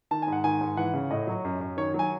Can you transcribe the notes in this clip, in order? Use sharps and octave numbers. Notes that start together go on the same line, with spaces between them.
D#3 A5
G#2 G#5
F#5
D#3 G#5
G#2
E3 F#5
C#3
A2 D#5
F#3
F#2
F#2
D#3 C#5
F#3
G#5